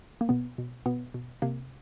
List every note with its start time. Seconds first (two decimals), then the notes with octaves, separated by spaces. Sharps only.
0.21 A#3
0.29 B2 B3
0.58 B2
0.86 B2 B3
1.14 B2
1.42 C3 A#3